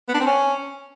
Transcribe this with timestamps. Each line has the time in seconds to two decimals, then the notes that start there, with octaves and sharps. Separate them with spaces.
0.08 B3
0.14 D4
0.20 C4
0.26 C#4